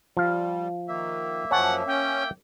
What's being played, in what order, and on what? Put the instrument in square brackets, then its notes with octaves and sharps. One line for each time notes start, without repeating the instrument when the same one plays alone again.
[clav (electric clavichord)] F3 F5 [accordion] G3
[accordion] D#3 [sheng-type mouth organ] A#3 E5
[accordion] F#2 F3 [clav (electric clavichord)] C#5 G#5 A5 [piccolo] F#5
[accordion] C#4 [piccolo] G5